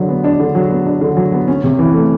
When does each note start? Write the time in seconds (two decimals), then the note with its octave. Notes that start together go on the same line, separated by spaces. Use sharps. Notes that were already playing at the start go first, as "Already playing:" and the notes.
Already playing: D3 F#3 D4
0.09 B3
0.24 D4
0.40 D3
0.55 F#3
0.70 B3
0.86 D4
1.01 D3
1.17 F#3
1.32 B3
1.48 C#4
1.64 C3
1.79 E3
1.94 A3